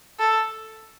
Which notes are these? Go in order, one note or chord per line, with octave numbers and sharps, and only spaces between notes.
A4